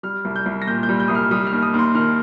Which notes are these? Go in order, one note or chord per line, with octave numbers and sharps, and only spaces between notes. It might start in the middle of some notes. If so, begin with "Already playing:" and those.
G3 F6
C2
G6
C2
A#6
A#2 G6
G6
G3
G6
C2 D#6
F6
G3 D#6
F6
D#2
D#6
D#2
C6
D#3 F6